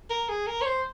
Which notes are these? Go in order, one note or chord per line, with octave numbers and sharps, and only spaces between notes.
A#4
G#4
A#4
C#5
C5